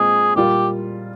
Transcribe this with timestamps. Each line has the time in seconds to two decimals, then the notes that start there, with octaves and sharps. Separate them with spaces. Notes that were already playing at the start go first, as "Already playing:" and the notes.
Already playing: A#2 G#3 C4 G#4
0.36 A#2 G3 A#3 F4 G4